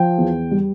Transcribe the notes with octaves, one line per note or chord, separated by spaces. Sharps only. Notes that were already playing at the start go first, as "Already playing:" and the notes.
Already playing: F3 G5
E2
G3